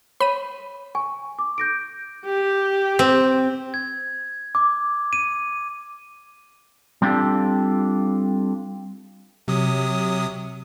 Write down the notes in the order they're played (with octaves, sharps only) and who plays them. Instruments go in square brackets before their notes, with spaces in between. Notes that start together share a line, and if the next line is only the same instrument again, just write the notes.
[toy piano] C#5 [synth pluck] B5 D#7
[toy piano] G#5 [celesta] C#6
[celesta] D6
G6 A#6 D7
[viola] G4
[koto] C4
[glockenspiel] G#6
D6
D#7
[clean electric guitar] G3 C4 D4 F4 G4 A4
[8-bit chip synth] C3 F#3 D#6